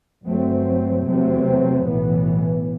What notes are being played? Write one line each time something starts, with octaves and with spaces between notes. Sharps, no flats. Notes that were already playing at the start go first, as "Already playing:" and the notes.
G1 G2 F#3 A3 C4
E2 C3 F#3 A3 C4
B1 A2 E3 B3